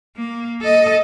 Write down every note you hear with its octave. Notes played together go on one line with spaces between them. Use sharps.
A#3
A4 D#5